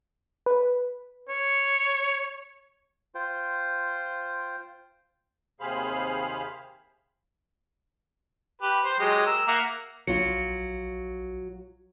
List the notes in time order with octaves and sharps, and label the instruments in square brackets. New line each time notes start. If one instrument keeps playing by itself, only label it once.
[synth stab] B4
[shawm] C#5
[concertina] F4 C5 G5
[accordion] D#2 C3 G#4 C5 F5 B5
[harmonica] G4 B4
C5
F#3 G#3 G4
A#4 E6
A#3 E5 F#5
[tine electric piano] A#1 C#7 [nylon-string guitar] F#3 F4